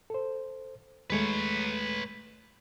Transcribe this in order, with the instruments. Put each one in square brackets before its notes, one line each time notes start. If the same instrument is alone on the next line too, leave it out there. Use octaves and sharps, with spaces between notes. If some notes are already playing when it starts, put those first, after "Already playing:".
[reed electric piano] A4 C5
[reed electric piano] D#2 G#3 A3 [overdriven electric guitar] B4 C#5